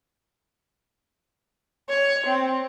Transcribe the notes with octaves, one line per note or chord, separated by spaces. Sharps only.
C#5
C4